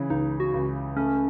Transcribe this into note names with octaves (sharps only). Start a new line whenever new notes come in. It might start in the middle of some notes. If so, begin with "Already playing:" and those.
Already playing: C#3 E3
C#2 D#4
F#4
C#2
A3 C#4